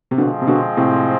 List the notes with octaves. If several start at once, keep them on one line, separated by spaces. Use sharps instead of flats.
C3
B2 D3 F3 G#3 C4
C3
B2 D3
A2 C3